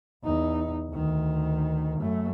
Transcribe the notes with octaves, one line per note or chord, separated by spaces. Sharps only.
E2 D#4
D2 D#3
F#2 A3